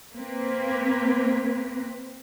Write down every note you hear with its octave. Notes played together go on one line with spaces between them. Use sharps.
A#3 C4 B4